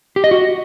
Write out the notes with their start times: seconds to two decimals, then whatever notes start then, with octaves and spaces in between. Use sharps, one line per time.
0.16 G4
0.24 D#5
0.31 F#4